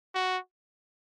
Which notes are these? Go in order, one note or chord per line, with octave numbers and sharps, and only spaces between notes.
F#4